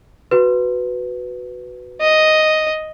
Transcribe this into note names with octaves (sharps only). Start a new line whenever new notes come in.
F#4 B4
D#5